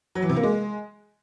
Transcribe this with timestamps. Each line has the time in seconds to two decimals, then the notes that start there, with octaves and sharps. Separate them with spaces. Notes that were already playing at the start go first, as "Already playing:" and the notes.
0.15 F#3
0.22 E3
0.29 C3
0.36 A#3
0.43 G#3